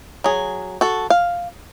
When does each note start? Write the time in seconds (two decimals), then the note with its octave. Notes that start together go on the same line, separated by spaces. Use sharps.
0.24 F#3 G#4
0.81 F#4 A4
1.10 F5